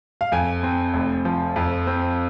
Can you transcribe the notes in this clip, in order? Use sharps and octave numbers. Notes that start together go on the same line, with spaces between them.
F5
F2 G#5
C4
F1
F3
F2
C4